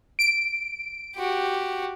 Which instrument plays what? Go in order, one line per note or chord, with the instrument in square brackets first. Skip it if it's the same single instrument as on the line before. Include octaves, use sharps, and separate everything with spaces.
[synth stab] D7
[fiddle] F#4 G4